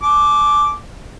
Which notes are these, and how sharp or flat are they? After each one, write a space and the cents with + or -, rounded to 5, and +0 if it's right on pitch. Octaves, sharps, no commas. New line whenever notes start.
A5 -45 D6 +0